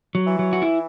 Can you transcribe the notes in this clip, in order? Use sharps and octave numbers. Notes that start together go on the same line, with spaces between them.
F#3
E3
F#3
F#4
E4